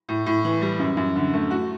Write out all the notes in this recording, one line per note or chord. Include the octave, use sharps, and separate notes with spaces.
A2
A2
E3
G3
F#2
F#2
D3
A3
F#4